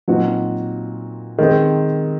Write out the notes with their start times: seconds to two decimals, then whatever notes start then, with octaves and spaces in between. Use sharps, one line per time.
0.08 A#2 F#3 C4 D#4 F#4
1.38 D#3 G#3 C4